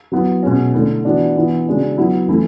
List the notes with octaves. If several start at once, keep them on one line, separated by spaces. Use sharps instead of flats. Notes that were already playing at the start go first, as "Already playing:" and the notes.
F#3 B3 E4
B2 G#3 C#4
D3 A3 E4
E3 B3 D4 F#4
E3 B3 E4
C#3 G#3 D4 F#4
F#3 B3 E4
E3 A3 E4